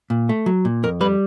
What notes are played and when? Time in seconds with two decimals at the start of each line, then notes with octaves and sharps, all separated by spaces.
0.10 A#2
0.29 A3
0.46 F#3
0.65 A#2
0.83 F2 A#4
1.01 G3 B4